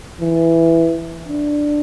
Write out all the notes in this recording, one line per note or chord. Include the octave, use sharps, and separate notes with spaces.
E3
D4